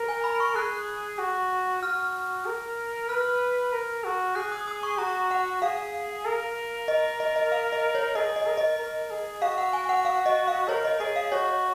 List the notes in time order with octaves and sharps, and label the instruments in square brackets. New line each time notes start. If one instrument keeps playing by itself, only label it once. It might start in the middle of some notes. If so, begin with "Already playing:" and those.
Already playing: [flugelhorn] A#4
[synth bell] G#5
B5
C#6
[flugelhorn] G#4 [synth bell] F#6
[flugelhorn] F#4
[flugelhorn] F#4 [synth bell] F6
[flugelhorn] A#4
[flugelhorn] B4 [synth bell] F6
[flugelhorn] A#4
F#4
[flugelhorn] G#4 [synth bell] F#6
[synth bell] D#6
D#6
C#6
[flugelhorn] F#4 [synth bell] A#5
[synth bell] F#5
[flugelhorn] G#4 [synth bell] F5
[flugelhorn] A#4
[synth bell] D#5
D#5
D#5
F5
D#5
C#5
[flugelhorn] G#4 [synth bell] D#5
[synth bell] D#5
[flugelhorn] A#4
[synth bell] D#5
[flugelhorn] A#4
G#4
[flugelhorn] F#4 [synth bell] F5
[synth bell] F#5
G#5
F#5
F5
D#5
F5
[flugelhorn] A#4 [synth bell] C#5
[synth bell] D#5
[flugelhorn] G#4 [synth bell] D#5
[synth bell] F5
[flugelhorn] F#4 [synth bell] C#5